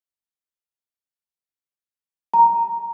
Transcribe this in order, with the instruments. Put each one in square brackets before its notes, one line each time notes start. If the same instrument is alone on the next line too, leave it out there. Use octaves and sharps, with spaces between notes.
[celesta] A#5